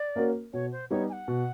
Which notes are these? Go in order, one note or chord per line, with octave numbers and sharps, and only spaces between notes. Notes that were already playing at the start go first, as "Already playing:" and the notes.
Already playing: D5
A#3 C#4 F#4 A#4
B2 C#5
C5
G3 B3 D#4 G4 C#5
G#5
F#5
B2